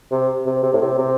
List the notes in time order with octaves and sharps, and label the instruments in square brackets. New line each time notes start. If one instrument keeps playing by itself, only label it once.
[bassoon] C3
C3
C3
A2
C3
C3